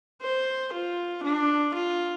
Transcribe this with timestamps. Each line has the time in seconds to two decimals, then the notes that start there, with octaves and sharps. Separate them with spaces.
0.21 C5
0.73 F4
1.23 D4
1.75 F4